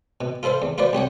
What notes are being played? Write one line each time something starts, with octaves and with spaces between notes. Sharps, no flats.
B2
F4 A4 B4 C5 F5
E2
F4 F#4 B4 C5 D5
C2 G4 C#5 F#5